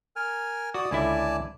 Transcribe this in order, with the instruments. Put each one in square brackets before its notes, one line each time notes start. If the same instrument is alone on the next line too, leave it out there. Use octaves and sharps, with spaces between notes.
[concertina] A#4 G#5 F6
[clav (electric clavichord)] F#4 [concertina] D5 D#6
[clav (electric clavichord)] C#2 D3 E4 [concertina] D5 G#5 A5